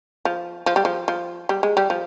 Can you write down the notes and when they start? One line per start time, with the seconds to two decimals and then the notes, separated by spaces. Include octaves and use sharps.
0.25 F3
0.66 F3
0.76 G3
0.85 F3
1.08 F3
1.49 G3
1.63 G#3
1.77 G3
1.90 F3